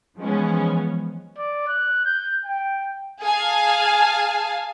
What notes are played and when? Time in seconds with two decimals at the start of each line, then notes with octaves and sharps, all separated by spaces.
0.17 E3 F3 G#3 B3 C#4
1.38 D5
1.67 F#6
2.05 G6
2.45 G5
3.23 G#4 F5 G#5 A5